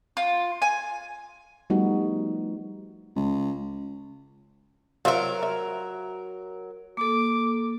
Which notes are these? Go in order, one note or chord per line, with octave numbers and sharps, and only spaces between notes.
F4
G#5
F3 G3 A3 B3 D#4 F#4
C#2
F#3 F4 A#4 C5 E5
E5
A#3 A4 D6